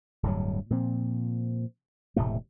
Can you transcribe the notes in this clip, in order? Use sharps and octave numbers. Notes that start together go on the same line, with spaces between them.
D1 G2 F#3
A#2 F3 C4
E1 A2 C3 A3